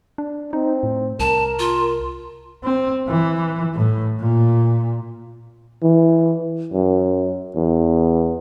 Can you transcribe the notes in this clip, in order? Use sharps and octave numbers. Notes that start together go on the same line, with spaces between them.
D4
C4 D#4
A2
C2 A#4 A5
F4
C4
E3
A2
A#2
E3
F#2
E2